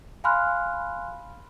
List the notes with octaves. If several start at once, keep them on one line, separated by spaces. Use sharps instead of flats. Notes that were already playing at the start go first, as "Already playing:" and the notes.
F5 G#5 B5 C6 F6 F#6